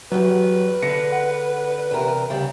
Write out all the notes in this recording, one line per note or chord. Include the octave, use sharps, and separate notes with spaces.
E2 G2 F#3 B4
D3 A#6 C#7
F#5
E2 C3 A#4
D2 C#3 G3